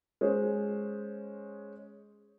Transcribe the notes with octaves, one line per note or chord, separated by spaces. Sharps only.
G#3 C#4 G#4 C5